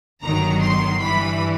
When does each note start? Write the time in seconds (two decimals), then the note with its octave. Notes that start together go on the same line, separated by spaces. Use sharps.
0.23 G1 G2 D#3 F#3 A#5
0.61 C6
1.01 G2 E3 G3 B5